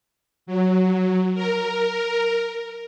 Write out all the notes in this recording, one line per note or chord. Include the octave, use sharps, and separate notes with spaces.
F#3
A#4